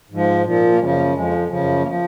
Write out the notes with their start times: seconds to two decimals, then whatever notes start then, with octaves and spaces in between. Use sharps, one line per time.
0.10 G#2 F3
0.45 A#2 F3
0.72 A#3
0.79 F#2 C#3 F3 G#3
0.96 A#3
1.14 F2 F3 G#3
1.48 F#2 C#3 F3
1.82 A#3
1.87 F3